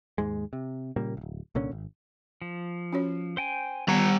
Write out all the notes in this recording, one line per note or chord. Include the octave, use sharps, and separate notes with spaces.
D#2 G#2 G#3
C3
A#2 C#3 G3 A#3
D1 B1
C2 A#2 D3 C#4
G#1
F3
C#4 F#4 C#5
C5 G5 G#5
D#3 G3 B3 B4 F#5 G5 A#5